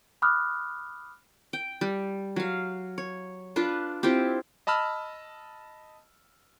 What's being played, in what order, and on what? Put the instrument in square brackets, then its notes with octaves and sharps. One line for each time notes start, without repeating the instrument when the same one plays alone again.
[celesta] B5 D6 D#6 F6 F#6
[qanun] G5
G3
F#3 F5
C#5
D4 F4 B4
C4 E4 F4 G4
[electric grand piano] D#5 A5 B5 E6 F6